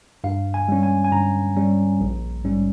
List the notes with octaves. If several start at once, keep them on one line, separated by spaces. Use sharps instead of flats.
G2 F5
G#5
G3 C#4
G#5
G#5
G2 A#5
G3 C#4
A#1
G#2 G3 C#4